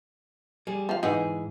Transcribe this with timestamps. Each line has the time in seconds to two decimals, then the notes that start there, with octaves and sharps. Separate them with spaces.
0.67 G3 G#4
0.89 F3 F5
1.03 G#2 E3 D#4 G#4 B4 F#5